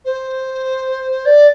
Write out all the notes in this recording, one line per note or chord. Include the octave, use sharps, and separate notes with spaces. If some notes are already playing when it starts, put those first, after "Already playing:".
C5
D5